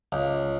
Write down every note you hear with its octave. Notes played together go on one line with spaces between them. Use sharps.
C#2